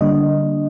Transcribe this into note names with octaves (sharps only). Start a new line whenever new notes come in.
D3 G3 A#3 D4 D#5